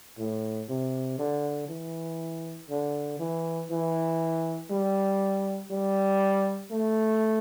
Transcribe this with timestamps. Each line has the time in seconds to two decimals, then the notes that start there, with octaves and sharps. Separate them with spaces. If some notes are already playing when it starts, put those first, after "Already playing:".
0.18 A2
0.69 C3
1.19 D3
1.69 E3
2.70 D3
3.19 E3
3.70 E3
4.71 G3
5.70 G3
6.71 A3